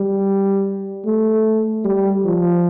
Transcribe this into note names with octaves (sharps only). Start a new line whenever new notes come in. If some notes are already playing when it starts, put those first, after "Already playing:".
Already playing: G3
A3
G3
F3